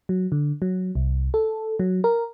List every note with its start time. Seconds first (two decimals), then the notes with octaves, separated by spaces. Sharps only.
0.09 F#3
0.32 D3
0.62 F#3
0.95 C2
1.34 A4
1.79 F#3
2.04 A#4